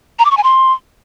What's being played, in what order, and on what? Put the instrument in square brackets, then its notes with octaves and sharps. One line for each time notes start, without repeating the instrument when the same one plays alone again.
[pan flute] A#5
D6
C#6
G#5
C6